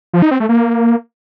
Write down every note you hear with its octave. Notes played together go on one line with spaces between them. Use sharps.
F3
D#4
C4
A3
A#3